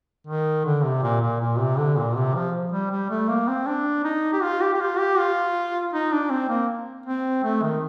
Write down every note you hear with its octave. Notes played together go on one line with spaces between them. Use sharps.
D#3
D3
C3
A#2
A#2
A#2
C3
D3
A#2
C3
F3
G3
G3
A3
A#3
C4
D4
D#4
G4
F4
G4
G4
F4
G4
F4
D#4
D4
C4
A#3
C4
A3
D#3